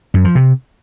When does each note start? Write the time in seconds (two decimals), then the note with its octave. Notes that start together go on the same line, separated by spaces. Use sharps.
0.14 F#2
0.25 F3
0.35 C3